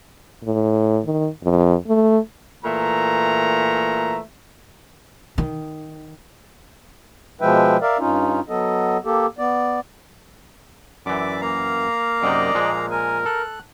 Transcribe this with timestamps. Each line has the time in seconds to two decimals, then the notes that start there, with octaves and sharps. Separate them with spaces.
0.43 A2
1.05 D#3
1.43 F2
1.87 A3
2.64 A#2 E3 A3 E5 A#5
5.38 D#3
7.41 B2 F3 G#3 B4 E5 G5
7.82 A#4 D5 E5 F5
7.99 G2 C#4 D#4 F4
8.49 F#3 B3 A4 D#5
9.05 A#3 G4 A4
9.38 B3 D5
11.06 F#2 E3 D5 E5 D6
11.41 A#3 F5 A#5
12.23 F#2 C3 D#4 D5 D#5
12.55 A#2 F3 G#3
12.91 A#4 G#5
13.26 A4 F#6